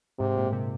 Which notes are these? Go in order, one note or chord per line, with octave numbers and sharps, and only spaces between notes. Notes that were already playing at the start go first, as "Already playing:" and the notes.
G#2 C3
A#2
C3